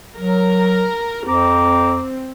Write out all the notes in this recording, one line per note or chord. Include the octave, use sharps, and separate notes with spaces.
F#3 A#4
F2 C4 A#5 D6